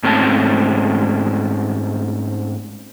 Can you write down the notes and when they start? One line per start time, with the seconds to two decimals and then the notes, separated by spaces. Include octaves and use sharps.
0.03 G#2 A3 C4 C#4 A5